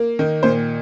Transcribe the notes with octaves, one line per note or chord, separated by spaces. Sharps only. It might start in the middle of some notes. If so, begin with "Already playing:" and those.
Already playing: A#3
D#3
A#2 C5